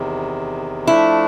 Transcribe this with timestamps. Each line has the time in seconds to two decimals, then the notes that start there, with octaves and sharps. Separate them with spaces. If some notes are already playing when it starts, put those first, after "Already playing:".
Already playing: E2 C3 D#3
0.87 F3 A3 D4 E4